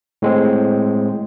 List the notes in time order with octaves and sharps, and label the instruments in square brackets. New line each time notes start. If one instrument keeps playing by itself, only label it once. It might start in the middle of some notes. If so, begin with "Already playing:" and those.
[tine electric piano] A2 G#3 C4